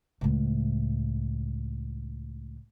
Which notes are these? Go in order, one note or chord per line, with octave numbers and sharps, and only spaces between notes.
C#2 A2